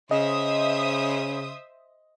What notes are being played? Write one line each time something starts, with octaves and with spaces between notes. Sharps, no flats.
C#3 C5 D#5 E5 D#6